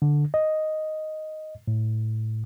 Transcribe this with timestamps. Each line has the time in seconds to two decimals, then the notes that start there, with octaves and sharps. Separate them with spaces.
0.02 D3
0.34 D#5
1.68 A2